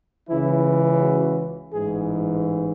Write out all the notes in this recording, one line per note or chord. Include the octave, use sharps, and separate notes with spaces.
C#2 C#3 E3 E4
F#4
A1 G#2 E3 G#4